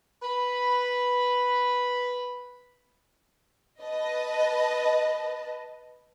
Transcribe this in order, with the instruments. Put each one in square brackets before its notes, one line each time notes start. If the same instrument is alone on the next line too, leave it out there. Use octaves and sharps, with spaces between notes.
[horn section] B4 B5
[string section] B4 D#5 A5